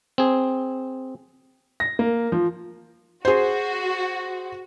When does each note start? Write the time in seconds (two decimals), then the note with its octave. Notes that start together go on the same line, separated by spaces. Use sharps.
0.18 C4 G#4
1.80 A#6
1.99 A#3
2.32 F3
3.25 F#4 G#4 C5